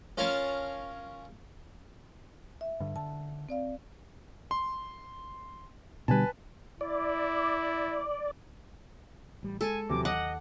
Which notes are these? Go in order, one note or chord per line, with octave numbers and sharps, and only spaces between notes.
C#4 F4 A#4 C#5 F5 A5
E5
G2 D3
D3 A5
C4 D5 F5
C6
B2 D3 G3 B4 G#5 A5
E4 D5
A1 G3
G#3 A4 G#5
D#2 C3 E3 F#3 D6
D#5 F#5 D6